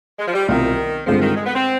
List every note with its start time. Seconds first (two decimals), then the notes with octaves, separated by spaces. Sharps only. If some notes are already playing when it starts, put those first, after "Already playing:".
0.19 G#3
0.27 F3
0.33 G3
0.48 C2 B2 D#3 G3 C4 F4
1.07 G2 D3 F3 G#3 C4 F4
1.21 D#3
1.36 G#3
1.46 B3
1.55 C4